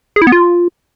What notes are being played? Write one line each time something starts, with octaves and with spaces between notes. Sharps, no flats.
G#4
E4
B3
F4